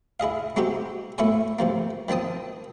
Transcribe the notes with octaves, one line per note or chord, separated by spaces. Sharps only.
E4 G#4 D#5 F5
G#3 C4 D#4 F#4 G4
A2 A3 E4 A4 C#5 G#5
A2 C3 F3 A#3
D#3 F3 C4 A5 D#6